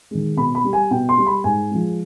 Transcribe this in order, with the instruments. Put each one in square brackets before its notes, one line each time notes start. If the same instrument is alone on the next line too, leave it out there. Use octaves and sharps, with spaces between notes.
[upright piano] D#3 G#3
B2 B5
B5
G3
G#5
B2 G5
C6
G3
B5
G#2 G#5
F3 G#3